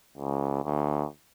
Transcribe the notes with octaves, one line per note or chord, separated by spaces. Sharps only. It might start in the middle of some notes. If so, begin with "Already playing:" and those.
C#2
D2